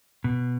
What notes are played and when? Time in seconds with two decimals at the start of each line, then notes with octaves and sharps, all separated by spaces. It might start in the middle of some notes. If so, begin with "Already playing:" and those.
0.24 B2